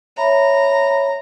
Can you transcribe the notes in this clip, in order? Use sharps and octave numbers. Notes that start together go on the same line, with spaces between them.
C#5 E5 A#5 B5